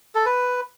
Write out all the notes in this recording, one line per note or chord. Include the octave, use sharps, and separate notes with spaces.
A4
B4